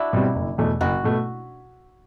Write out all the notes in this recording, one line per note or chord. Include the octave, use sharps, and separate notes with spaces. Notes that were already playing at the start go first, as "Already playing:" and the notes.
Already playing: D4 E4 F#4
B2 G3 C4
F#1
E2 B2 A3
F#1 F#4
B2 A3